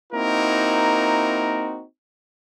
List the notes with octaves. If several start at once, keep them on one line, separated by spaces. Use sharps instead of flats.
A#3 C4 D#4 E4 F#4 A#4